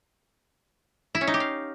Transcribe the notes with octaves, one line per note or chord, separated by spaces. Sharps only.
E4
C#4
D#4
G4
F5